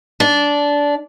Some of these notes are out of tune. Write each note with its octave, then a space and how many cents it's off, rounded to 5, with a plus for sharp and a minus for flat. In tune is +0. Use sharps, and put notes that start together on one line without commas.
D4 -15